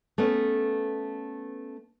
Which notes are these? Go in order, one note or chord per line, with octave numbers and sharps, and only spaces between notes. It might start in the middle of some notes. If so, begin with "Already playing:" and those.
A3 B3 C#4 B4